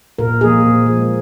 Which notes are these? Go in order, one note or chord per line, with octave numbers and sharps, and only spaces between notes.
A#2 A#4
F3 A#3 G#4
A#2
F3 G#3